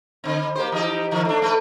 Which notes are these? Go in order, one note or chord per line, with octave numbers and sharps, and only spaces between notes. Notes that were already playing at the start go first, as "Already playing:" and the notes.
D3 C4
A#3 G4 C5
E3 D#4 G4
D#3 E3
A3 D4
A3 B4